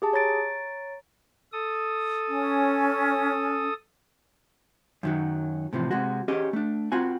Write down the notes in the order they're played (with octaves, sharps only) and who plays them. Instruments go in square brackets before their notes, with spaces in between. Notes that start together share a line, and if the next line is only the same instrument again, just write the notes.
[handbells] G4 G#4 A5
C#5 A#5 A6 D7
[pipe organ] A4 D#6
[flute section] C#4
[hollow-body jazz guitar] F#2 D#3 F#3
A2 C3 E3 F3
C3 G#3 F#4
C#4 G4 G#4 D#5
A3 D4
C4 F4 F#4 G#5